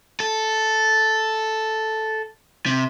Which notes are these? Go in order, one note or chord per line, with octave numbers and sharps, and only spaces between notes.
A4
C3